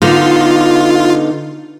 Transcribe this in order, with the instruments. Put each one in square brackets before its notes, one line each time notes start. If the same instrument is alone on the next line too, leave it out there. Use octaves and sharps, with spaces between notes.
[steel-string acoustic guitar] D3 B3 D#4 [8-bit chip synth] F4